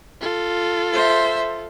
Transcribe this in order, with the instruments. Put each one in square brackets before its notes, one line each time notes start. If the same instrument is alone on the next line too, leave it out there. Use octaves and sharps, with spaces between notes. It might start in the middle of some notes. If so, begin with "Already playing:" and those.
[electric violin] F4 A4
[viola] C5 E5